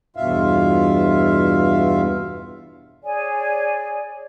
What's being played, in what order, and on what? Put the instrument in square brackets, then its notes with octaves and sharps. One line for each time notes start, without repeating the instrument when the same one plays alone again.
[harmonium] E2 G2 B2 F4 E5 F5
[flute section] G#4 C#5 D5 G#5